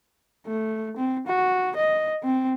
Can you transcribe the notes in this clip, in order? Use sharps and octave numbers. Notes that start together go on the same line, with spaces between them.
A3
C4
F#4
D#5
C4